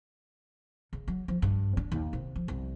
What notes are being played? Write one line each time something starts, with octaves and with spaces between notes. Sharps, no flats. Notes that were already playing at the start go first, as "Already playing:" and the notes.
C#3
F#3
F3
G2
D4
D#2
C3
F3
C2